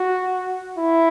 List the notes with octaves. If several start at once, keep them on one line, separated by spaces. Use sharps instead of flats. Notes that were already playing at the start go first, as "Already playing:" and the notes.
Already playing: F#4
E4